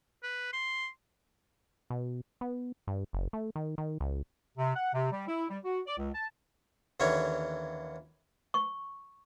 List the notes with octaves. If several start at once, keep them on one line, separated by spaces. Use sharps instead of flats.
B4
C6
B2
B3
G2
F#1
A3
D#3
D#3
C#2
C3
F#5
C3
G3
E4
G3
F#4
D5
C#2
A5
D#2 D3 E3 C#4 C#5
C#6